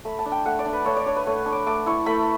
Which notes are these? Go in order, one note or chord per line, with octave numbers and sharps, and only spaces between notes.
A3 B5
A5
D4
G5
A3 F#5
D5
D4
B4
A3 C#5
D5
D4 C#5
B4
A3 C#5
D4
D6
A3 D6
E4 C#6
A3 B5